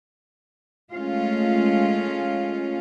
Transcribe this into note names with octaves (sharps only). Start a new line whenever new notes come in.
G#3 A3 C#4 F4